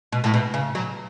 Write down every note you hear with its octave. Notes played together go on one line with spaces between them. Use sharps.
B2
A2
B2
C#3
F#3